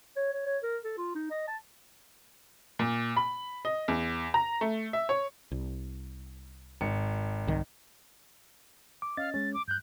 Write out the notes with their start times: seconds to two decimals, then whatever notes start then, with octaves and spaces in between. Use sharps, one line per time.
0.17 C#5
0.33 C#5
0.46 C#5
0.63 A#4
0.84 A4
0.98 F4
1.15 D#4
1.31 D#5
1.48 A5
2.79 A#2
3.17 B5
3.65 D#5
3.88 E2
4.34 A#5
4.61 A3
4.93 E5
5.09 C#5
5.51 C2
6.81 G#1 C#7
7.47 C2 D#3
9.02 D6
9.17 C#4 D#5 F5 A6
9.34 G#3 C#4 A6
9.54 D6
9.68 G2 F#6 G6